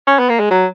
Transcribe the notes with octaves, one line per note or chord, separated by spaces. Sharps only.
C#4
B3
A#3
G#3
F#3